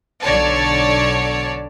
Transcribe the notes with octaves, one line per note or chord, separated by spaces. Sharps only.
B1 D3 C#5 D5 A5